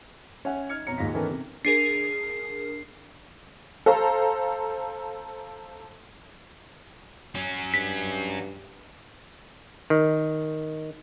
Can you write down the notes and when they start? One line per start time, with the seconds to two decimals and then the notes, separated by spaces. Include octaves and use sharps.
0.45 C#4 C#5 E5 F#5 G#5
0.69 D#4 F6 G#6 C#7
0.87 F2 B2 C#5 A#5 C#7
0.98 D#2 G#2 D#4 F4 A#6 B6
1.14 D#3 E3 B3 C#4 A4 A#4
1.31 C3
1.65 D4 G#4 A#4 C7
3.86 A4 C5 F5 A#5
7.35 F#3 C#4
7.74 G2 B6
9.90 D#3